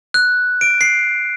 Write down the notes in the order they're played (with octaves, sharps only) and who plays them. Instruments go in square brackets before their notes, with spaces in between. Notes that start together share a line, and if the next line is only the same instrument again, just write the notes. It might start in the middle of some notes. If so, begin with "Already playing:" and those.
[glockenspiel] F#6
D7
C7